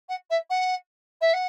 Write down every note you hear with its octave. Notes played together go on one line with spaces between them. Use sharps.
F#5
E5
F#5
E5
F#5